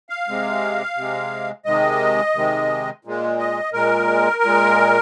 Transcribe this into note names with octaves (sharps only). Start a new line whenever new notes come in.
F5
C3 G#3
C3 G#3
C3 D#3 G#3 D#5
C3 D#3 G#3
A#2 G#3
D#5
A#2 G#3 A#4
A#2 G#3